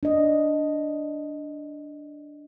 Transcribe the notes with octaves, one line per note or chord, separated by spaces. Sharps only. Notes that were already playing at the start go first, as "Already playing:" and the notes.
D4 D#5